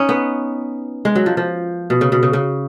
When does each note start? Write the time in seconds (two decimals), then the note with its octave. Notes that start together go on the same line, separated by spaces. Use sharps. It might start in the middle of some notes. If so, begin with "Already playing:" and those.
Already playing: C#4 D#4
0.09 B3
1.05 G#3
1.15 F#3
1.26 F3
1.37 F3
1.90 B2
2.01 C#3
2.12 B2
2.23 C#3
2.33 C#3